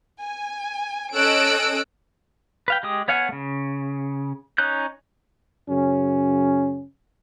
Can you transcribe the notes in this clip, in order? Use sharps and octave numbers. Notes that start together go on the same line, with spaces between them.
G#5
C#4 A4 D#5 E6 F#6 D7
B4 F5 G5
G#3 G4 D#6
B3 C#5 F5 F#5 G#5
C#3 A3
C#4 D#4 C#5 F#6 G6
F#2 C#3 C#4